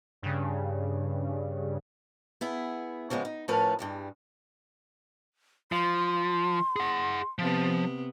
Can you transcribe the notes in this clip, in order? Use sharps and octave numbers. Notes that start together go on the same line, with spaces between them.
G2 C#3
B3 E4 G#4
C#3 F3 G3 G#3 B3
D#4
A2 F3 A3 C#4 A#4 B4
G2 G3 G#3
F3 C6
G#4 F#5
C3 F3 B3